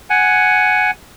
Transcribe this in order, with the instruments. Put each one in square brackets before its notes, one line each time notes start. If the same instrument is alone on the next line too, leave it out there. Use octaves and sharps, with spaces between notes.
[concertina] F#5 G#5